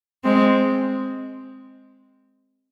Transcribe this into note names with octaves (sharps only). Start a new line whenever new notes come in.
G#3 C4